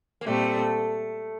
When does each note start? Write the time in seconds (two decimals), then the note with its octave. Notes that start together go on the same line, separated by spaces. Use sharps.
0.21 A#3
0.25 A#2 G3 A3 C4